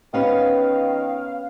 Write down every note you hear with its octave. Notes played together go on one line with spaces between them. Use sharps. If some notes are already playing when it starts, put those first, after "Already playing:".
D#3 B3 C#4 B4 F5